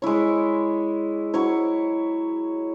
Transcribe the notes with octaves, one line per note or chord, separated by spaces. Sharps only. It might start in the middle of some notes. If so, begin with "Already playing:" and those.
G#3 E4 C#5
F#3 E4 C#5